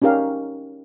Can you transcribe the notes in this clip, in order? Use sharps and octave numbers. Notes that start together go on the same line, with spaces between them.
C#4 D#4 G4 A#4 F5